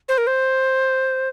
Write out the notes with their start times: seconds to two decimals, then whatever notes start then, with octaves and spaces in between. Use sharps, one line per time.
0.08 C5
0.18 A#4
0.27 C5